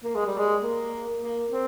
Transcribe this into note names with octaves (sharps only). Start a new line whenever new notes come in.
A#3
G#3
G3
G#3
A#3
A#3
C4